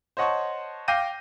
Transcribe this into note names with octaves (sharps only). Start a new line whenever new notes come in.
C5 C#5 D#5 F#5 A5 C#6
F5 G5 D6 G6 A#6 D#7